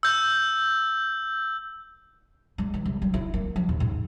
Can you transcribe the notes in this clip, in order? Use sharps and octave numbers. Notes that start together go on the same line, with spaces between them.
E6 G6
G#3
E3
C2
G3
E4
A#3
F3
D#2
G#2